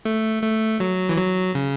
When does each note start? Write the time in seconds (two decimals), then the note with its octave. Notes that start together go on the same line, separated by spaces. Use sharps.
0.05 A3
0.43 A3
0.80 F#3
1.09 E3
1.17 F#3
1.55 C#3